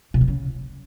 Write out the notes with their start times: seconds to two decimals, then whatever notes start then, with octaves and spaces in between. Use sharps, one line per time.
0.14 B2
0.21 E3
0.28 C#3